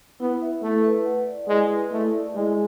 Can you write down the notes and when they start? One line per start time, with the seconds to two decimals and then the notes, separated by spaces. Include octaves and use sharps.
0.20 B3 E4
0.42 E5
0.62 A3 E4
0.84 B4
1.06 F#5
1.27 D5
1.48 G#3 E4
1.71 B4
1.91 A3 E4
2.13 D5
2.34 G#3 E4